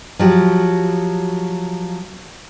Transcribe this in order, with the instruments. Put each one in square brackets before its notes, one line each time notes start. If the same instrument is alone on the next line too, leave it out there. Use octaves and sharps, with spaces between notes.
[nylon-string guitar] F3 F#3 G4